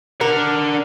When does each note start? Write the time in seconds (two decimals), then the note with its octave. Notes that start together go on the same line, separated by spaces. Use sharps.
0.21 D4 A#4 F#5